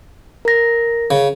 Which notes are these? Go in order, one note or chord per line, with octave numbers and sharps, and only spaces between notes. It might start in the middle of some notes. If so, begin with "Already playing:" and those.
A#4 A#6
C#3